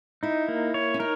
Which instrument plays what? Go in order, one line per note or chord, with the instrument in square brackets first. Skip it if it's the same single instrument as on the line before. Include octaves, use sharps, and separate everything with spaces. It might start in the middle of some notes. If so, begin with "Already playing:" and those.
[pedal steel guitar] D#4 [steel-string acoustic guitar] E4
[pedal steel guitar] A#3
C#5
[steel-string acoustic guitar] C#4
[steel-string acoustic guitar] D#4 [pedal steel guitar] A#4